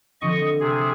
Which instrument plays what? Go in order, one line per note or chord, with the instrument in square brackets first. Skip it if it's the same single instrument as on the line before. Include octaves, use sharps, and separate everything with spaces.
[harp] D3 F3 C4 [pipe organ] D#5 C#6
[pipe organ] C3 G#4